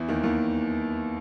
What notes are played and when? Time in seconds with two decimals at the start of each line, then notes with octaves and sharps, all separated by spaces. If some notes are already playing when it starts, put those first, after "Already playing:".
Already playing: E2 E3
0.09 D#2 D#3
0.23 D#2 D#3